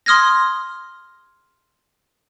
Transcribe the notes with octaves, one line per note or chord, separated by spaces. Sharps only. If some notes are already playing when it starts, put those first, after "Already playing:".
C6 D#6 F6 G#6 A#6